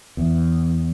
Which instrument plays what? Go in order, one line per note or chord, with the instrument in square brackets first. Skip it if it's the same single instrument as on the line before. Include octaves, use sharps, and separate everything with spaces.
[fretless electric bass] E2